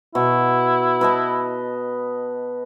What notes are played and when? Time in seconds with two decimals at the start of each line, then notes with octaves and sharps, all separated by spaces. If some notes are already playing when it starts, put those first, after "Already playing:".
0.15 B2 E4
1.01 B4 D#5 A5